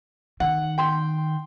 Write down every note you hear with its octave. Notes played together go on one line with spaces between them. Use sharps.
D#3 F#5
G5 C6